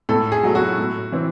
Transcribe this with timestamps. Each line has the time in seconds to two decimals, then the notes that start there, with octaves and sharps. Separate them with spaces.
0.09 A2 A4
0.32 G#4
0.43 F#3 A3
0.55 F#4
0.78 A2
1.12 E3 C4